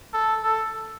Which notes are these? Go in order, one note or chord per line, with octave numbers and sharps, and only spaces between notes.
A4
A4